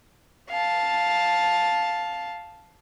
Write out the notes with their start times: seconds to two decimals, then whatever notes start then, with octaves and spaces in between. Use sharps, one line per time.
0.50 F5 A5